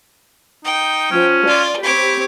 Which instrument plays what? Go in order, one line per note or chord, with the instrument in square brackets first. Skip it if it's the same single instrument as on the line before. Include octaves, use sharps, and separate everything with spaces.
[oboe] D#4 [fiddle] G5
[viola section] F3 [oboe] C#4
[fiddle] F4 [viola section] D5
[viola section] C4 G4 [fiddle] C#5 D6 [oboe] B5